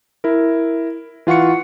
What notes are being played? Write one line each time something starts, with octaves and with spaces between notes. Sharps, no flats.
E4 A#4
E3 F4 F#5 C#6 C#7